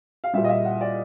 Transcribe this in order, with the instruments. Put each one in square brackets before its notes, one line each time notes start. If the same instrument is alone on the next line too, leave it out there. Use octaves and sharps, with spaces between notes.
[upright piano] F5
A#2 G3 E5
D#5
E5
F#5
D5